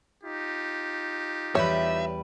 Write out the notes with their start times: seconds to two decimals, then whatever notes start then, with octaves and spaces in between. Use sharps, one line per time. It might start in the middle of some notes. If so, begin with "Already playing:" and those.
0.24 D#4 F4 G4
1.55 E2 G3 B4 C#5 E5